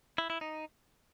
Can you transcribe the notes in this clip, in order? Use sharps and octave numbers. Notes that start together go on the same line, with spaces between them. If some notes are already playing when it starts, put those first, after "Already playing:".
E4
E4
D#4